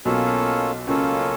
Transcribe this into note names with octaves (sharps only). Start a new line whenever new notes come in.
B1 B2 A#3 C#4 F4 A4
C#2 C#3 A#3 C#4 F4 A4